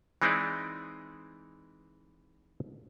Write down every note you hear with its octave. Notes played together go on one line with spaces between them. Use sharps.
E3 G#3 C4 D#4 E4 D5